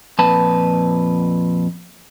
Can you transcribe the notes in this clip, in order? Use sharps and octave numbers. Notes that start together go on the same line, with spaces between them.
F2 A#2 B4 A5